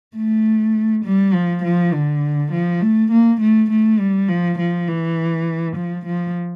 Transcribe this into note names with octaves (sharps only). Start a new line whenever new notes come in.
A3
G3
F3
F3
D3
F3
A3
A#3
A3
A3
G3
F3
F3
E3
F3
F3